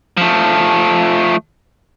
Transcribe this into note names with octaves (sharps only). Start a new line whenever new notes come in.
F3 A3